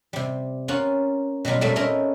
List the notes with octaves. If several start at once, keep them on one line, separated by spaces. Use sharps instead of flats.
C3 G3
A#3 C#4 F4 F#5
B2 F#3 G3 F4
A#2 G3 A3 C4
A3 C#4 D#4 E4 A#4